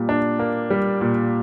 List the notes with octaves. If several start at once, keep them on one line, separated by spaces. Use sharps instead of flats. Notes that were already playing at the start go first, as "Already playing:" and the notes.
Already playing: A#2 G3
D4
A#3
G3
A#2